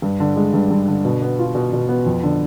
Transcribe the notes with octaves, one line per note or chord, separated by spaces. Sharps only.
G2
D3
G#3
G2
G2
D3
B2
B3
F4
B2
B2
B3
F2
D3